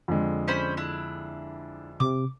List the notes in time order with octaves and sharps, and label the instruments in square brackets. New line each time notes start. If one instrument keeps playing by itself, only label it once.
[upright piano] F2 D3 G#3
[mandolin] C#4 C5 B5
D4 E4
[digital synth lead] C3 [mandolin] D6